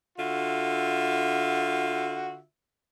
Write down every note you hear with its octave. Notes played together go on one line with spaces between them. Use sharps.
D3 F4 F#4 E5